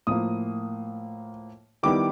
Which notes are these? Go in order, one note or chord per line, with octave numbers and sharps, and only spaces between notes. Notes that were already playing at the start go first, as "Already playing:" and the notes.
A2 F3 A#3 D#6
D#3 G3 B3 E4 D6